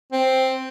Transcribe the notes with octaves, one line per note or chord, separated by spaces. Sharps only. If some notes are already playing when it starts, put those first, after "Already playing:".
C4